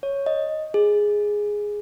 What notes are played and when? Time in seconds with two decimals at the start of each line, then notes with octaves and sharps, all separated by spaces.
0.03 C#5
0.26 D#5
0.74 G#4